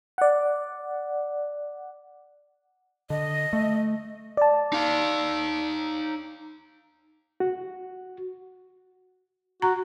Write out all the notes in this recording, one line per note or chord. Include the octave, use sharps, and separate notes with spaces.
D5 F#5
D3 D#5
A3
D5 A5
D#4 F5
F#4
F#4 A#5